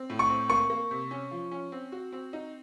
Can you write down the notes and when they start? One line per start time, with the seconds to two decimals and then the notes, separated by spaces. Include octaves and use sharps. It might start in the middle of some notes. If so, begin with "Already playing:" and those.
Already playing: C4
0.10 A2
0.19 C#6
0.30 C4
0.50 A#3 C#6
0.70 A#3
0.91 C3
1.11 C#4
1.31 F3
1.51 C#4
1.72 C4
1.92 F#4
2.12 C4
2.33 D#4